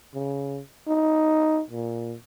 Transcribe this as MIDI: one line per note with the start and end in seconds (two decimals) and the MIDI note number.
0.15 0.61 49
0.88 1.61 63
1.70 2.15 46